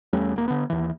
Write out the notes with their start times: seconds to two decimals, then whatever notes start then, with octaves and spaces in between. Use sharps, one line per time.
0.13 E2 G3 A3 C#4
0.36 E1 A#3
0.48 D3 B3
0.70 D#2 E3